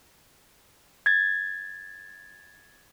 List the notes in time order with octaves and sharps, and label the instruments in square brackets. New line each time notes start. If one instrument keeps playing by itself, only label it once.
[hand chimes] G#6 A6